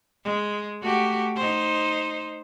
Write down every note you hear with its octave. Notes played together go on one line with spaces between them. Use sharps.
G#3
A3 F#4 G4
D#4 C5